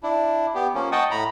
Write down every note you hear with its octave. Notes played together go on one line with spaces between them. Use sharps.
D4 E4
B3 G4
F3 A#3 C#4
D#5 F#5 G5 A5 C#6 D#6
A2 A#5 B5